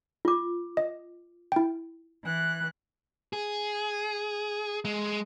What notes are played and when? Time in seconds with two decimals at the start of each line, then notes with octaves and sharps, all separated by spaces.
0.25 F4 D6
0.77 D#5
1.52 E4 G5
2.24 E3 F#6
3.33 G#4
4.85 G#3